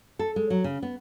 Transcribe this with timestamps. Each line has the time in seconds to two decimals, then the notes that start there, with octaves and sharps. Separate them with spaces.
0.19 A4
0.36 G#3
0.50 F#3
0.64 C#3
0.83 B3